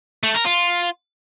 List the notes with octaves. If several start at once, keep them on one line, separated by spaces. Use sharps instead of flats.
A3
A#4
F4